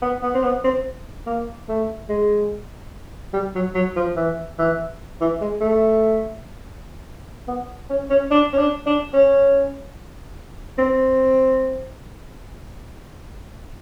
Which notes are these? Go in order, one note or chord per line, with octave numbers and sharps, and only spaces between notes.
B3
B3
C4
B3
C4
A#3
A3
G#3
G3
F#3
F#3
F3
E3
E3
E3
G#3
A3
B3
C#4
C#4
D4
C#4
D4
D4
C#4
C4